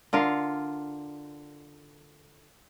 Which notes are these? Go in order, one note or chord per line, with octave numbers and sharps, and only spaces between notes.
D3 F4 A#4 F5